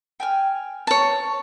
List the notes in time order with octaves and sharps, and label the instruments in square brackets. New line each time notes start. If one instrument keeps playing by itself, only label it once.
[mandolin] G5 G#5 F6
[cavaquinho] C#5 A5